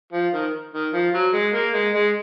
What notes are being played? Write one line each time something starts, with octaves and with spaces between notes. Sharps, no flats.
F3
D#3
D#3
F3
F#3
G#3
A#3
G#3
G#3